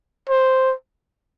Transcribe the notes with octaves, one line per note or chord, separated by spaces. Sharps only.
C5